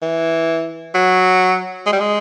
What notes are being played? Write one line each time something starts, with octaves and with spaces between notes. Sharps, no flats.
E3
F#3
G#3
G3
G#3